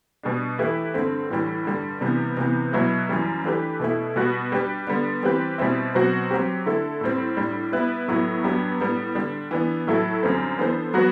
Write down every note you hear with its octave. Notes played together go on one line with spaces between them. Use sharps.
B2 G3 D4
E3 A3 E4 G4 B4
G2 D3 A3 C4
A2 E3 G3
G2 D3 G3
C3 E3 G3 B3
C3 E3 B3
B2 F#3 B3 E4 B4
F#2 E3 G3
E3 A3 D4 G4 B4
B2 A3 E4
B2 G3 B3 F#4 B4
G3 D4 G4 B4
D3 G3 B3 D4
E3 G3 C4 G4 B4
B2 G3 C4 E4
B2 F#3 C4 F#4 C5
F#3 C4 G4
D3 A3 E4 A4
A2 G3 C4
A2 G3 D4
G3 B3 E4 B4
A2 F#3 B3 E4
G2 F#3 B3 D4 G4
A2 G3 B3
D3 G3 D4
E3 B3 D4
A2 F#3 A3 E4 A4
F#2 D3 G3 C4
E3 B3 D4 A4 C5
F#3 B3 F#4 B4